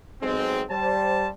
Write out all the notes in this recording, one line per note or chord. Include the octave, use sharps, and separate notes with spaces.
B1 G#2 G#3 C4
G3 C5 A5